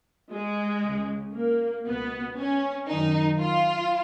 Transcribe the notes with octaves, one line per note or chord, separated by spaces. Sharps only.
G#3
C#2 C#3
A#3
C#2 B2 B3
C#4
F#2 D#3 D#4
F4